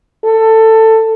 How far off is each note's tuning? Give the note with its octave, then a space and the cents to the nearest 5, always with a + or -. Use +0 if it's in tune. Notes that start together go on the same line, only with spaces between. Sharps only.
A4 +15